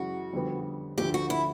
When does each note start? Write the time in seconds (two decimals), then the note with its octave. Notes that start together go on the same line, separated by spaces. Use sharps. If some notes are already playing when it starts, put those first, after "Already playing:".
Already playing: F#2 C#3 E3 G#3 C#4 F#4
0.33 F2 D3 G3 B3
0.98 D2 D3 F3 A3 G4
1.14 F#4
1.30 E4